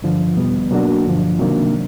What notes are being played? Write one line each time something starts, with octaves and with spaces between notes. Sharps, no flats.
G2 D3 F3
E2 B2 G3 B3
B2 F#3 A#3 D4 F#4
G2 D3 F3
C3 D#3 F#3 A#3 D4